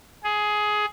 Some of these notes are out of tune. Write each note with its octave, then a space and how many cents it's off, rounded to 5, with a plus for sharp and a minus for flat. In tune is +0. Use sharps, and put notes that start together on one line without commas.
G#4 +15